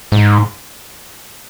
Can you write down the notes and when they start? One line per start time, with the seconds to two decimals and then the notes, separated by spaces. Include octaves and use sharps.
0.12 G#2